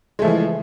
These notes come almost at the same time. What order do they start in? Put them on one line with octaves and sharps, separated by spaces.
G#3 A3 F3 E3